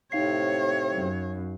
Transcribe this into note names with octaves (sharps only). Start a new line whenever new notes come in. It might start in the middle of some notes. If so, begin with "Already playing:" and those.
A2 C3 C4 D#4 C#5 F5 C7
F#2